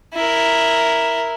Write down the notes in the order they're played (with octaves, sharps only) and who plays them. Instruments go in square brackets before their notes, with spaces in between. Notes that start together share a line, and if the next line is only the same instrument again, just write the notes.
[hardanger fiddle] E4 A#4